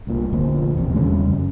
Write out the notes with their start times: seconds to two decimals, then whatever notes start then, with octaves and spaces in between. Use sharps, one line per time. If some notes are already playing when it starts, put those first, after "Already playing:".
0.07 C2 A#2
0.32 F1 D2 A#2 F3
0.77 A1 D#2 C3
0.95 E2 C#3 G3 C#4
1.28 F#2